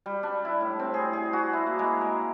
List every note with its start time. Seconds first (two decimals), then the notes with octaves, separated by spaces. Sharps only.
0.06 G3
0.23 D4
0.45 E4
0.61 A2
0.80 C4
0.94 G#4
1.13 G#4
1.33 F#4
1.53 E4
1.67 A#3
1.79 G#3
2.01 A#4